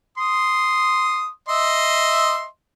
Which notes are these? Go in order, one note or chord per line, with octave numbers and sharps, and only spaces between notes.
C6 D#6
D#5 E5 C6